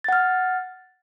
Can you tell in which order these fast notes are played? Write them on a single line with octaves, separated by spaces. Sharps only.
A6 F#5 F6